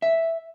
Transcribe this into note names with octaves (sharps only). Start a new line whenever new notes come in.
E5